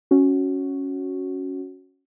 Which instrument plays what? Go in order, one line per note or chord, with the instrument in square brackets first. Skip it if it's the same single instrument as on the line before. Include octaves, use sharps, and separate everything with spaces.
[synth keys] C#4 F#4